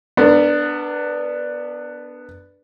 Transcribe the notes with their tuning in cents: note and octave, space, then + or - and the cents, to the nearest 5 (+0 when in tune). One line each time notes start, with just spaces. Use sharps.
B3 +0 D4 +5 A#4 -35